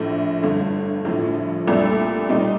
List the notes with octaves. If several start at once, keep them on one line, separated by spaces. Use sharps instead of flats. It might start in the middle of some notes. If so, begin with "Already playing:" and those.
Already playing: A#1 A2 A3
G1 G2 D3
A#1 A2 F3
C2 A#2 A3 D4 A4
A#2 G3 C4 D#4